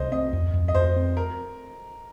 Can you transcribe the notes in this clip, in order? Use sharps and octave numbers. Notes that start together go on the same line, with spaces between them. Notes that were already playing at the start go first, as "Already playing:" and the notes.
Already playing: C2 C5 D#5
C4 D#5
F2
F2
D#5
F2 C5
C4
A#4